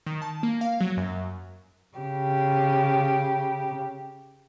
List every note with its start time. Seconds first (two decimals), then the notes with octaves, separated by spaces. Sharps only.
0.06 D#3
0.22 A5
0.43 A#3
0.61 F5
0.81 F#3
0.97 F#2
1.98 C#3 G4